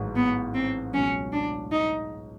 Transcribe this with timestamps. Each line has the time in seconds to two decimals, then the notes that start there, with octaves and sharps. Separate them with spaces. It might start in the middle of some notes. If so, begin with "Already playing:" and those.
Already playing: A1 G#2 D#3 F#3
0.16 B3
0.55 C4
0.93 C#2 B2 F#3 C#4
1.33 D4
1.72 D#4